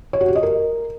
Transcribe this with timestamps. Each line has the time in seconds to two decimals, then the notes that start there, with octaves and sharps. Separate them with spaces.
0.13 C#5
0.21 F#4
0.28 G4
0.35 D#5
0.43 A#4